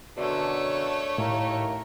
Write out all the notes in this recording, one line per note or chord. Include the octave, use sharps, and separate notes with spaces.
F#2 B2 D3 A3 D4 C#5
D#2 A2 A#3 E4 A#4